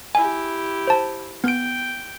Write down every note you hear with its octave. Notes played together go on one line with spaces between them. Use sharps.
E4 G4 G#5
C5 A5
B3 G5 D7